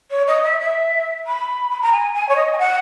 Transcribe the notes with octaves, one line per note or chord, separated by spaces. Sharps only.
C#5
D#5
E5
E5
B5
B5
A#5
G#5
G#5
C#5
D#5
G#5
F#5